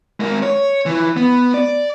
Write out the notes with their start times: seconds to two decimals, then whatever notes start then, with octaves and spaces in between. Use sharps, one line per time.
0.20 G#3 A#4
0.43 C#5
0.86 E3
1.17 B3
1.54 D5